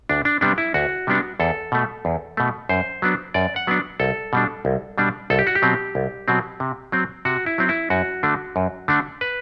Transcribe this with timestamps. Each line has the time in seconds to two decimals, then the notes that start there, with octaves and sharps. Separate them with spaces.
0.09 D2 D4
0.25 D4
0.41 C3 G3 B3 D4
0.58 E4
0.74 D2 F#4
1.07 C3 G3 B3 D4
1.40 E2 A4
1.72 B2 A3
2.05 E2
2.37 B2 A3
2.69 F#2 C5
3.02 F#3 B3 D4
3.34 F#2 D5
3.56 F#5
3.67 F#3 B3 D4
4.00 C2 A4
4.33 B2 G3 D4
4.65 C2
4.98 B2 G3 D4
5.30 C2 A4
5.39 G4
5.47 F#4
5.55 G4
5.62 B2 F#3 C4
5.95 C2
6.28 B2 F#3 C4
6.60 C3
6.92 F#3 C4
7.25 C3 F#4
7.46 E4
7.58 F#3 C4
7.69 E4
7.90 F#2 F#4
8.23 D3 A3 D4
8.56 F#2
8.88 D3 A3 D4
9.21 B4